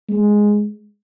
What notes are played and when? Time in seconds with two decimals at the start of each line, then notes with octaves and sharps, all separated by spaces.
0.09 G#3